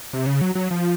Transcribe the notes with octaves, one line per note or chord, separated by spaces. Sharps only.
C3
C#3
F#3
F#3
F3